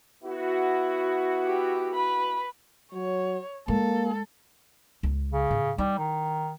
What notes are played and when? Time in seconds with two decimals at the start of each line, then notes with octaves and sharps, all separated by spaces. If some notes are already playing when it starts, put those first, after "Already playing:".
0.24 B3 E4 F#4
1.45 G4
1.94 B4 B5
2.93 F#3 C#5
3.68 G#3 A#3 A4
5.03 C#2
5.33 C#3
5.51 A2
5.78 G3 D#4 E4
5.98 D#3